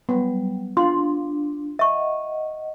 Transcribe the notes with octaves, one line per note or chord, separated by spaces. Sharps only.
F#3 G3 B3
D4 F4 C6
D#5 E5 F#5 C#6